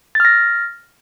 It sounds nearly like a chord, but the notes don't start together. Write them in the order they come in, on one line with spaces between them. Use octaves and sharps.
A6 F6 A#6